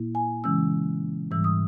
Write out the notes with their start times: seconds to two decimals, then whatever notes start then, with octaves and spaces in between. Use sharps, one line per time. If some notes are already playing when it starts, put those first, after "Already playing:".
Already playing: A#2 A#3 E4
0.15 G#5
0.44 C#3 E3 G#3 C#4 E6
1.31 G#2 E3 G3 E6
1.44 D#6